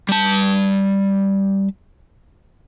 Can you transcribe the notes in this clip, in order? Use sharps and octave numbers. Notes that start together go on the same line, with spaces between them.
G3 A5